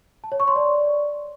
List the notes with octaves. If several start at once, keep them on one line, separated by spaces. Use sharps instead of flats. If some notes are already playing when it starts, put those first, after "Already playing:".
A5
C#5
C#6
C6
D5